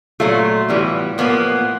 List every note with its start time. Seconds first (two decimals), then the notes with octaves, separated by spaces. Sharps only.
0.20 A#2 F#3 A3 F4
0.68 A2 E3 G3 B3
1.18 A2 F3 A#3 B3